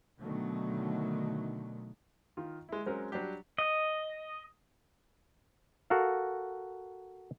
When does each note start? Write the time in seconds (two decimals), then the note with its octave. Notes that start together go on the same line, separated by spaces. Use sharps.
0.20 B2 D3 D#3 F#3 A3
2.37 D#3 F4
2.69 G#3 E4
2.86 F#3 G#3 C4 C#4 A#4
3.12 F#3 G3 D4 G4
3.58 D#5
5.90 F#4 A4 A#4 F5